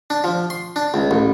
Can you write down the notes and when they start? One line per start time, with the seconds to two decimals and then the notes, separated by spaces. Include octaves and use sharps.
0.10 D4
0.24 F3
0.50 C6
0.76 D4
0.94 C#2
1.11 A1